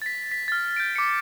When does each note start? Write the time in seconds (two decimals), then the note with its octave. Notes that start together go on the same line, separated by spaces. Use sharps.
0.02 A6 B6
0.32 B6
0.48 F6 A6
0.77 G6 D7
0.96 D6 C#7